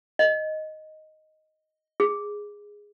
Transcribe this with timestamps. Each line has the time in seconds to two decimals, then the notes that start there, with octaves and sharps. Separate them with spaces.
0.19 D#5
2.00 G#4